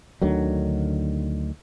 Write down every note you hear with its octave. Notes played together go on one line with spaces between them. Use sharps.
D2 D3 D#3 F#3